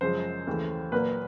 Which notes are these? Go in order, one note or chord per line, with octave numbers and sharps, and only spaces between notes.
F#2 C#3 F3 G#3 C5
D#2 C#3 E3 A3
A#2 F#3 A#3 B4